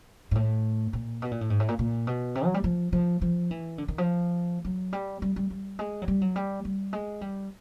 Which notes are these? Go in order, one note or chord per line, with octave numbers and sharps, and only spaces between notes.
G#2
A2
A#2
B2
A#2
A2
G#2
A2
A#2
A#2
B2
C3
F#3
G3
F3
F3
F3
E3
D3
D#3
F3
F#3
G3
G3
G3
G3
G#3
F#3
G3
F#3
G3
G3
G#3
G3